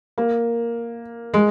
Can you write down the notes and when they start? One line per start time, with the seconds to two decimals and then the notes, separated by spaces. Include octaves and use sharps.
0.18 A#3
1.34 G#3